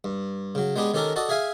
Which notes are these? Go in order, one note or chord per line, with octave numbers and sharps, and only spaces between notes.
G2
C#3 F#3
G#3 B3 D4 G4 G#4
D#3 C#4 G4 A4 A#4 A#5
F#4 A4 D5 D#5
G#4 E5 F5 G#5